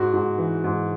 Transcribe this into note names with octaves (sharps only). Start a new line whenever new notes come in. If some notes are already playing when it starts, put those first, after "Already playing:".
Already playing: G#2 F#4
G#2
E3
G#2